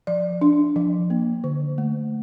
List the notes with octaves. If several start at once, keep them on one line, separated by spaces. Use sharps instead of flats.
F3 D5
D4
F3
A#3
D3
A3